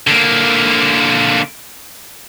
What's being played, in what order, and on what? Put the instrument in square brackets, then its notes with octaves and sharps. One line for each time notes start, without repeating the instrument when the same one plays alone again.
[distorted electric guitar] D3 A#3